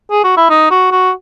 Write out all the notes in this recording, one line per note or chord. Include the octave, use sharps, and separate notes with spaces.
G#4
F#4
E4
D#4
F#4
F#4